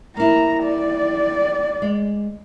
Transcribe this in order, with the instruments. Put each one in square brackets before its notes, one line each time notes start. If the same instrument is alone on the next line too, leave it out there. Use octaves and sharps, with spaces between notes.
[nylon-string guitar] A#3 E4 [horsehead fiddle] A#5
[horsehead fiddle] D5
[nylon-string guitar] G#3